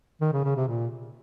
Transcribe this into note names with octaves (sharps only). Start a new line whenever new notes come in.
D#3
C#3
C#3
C3
A#2